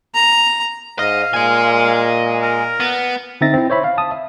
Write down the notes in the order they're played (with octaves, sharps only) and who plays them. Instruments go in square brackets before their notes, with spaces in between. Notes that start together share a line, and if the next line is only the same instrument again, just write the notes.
[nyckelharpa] A#5
[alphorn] G#2 [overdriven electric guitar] D#5 [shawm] F5
[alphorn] A#2 [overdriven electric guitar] D#5 G#5
[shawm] A#4
[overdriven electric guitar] B3
[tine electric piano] D3 C4 D#4 E5 A6 A#6
C4 E4
C5 C#5 E5 B5
F5
A5 D#6
E5